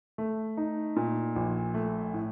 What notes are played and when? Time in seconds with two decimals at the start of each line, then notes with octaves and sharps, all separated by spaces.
0.18 A3
0.57 D#4
0.96 A#2
1.36 A#1
1.74 A3
2.14 A2